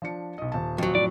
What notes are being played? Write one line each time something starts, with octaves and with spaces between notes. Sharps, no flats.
F3 D4 C#7
B1 D#5
D#1 A5
F2 F#3
A2 D5